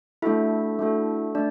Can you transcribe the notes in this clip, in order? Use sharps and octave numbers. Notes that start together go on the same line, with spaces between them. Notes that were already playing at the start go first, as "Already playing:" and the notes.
A3 D4 E4 F#4 A4 E5
A3 D4 F#4 A4
A3 D4 D5